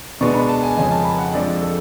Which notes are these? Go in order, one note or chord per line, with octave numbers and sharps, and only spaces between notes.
B2 G#3 B3 D4 C#6
B5
A5
G#5
F2 C#3 G#3 C#4 G#5
A5
B5
F#5
F2 F3 G#3 D4 D5
A4